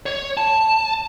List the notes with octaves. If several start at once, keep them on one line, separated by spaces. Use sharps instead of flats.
C#5
A5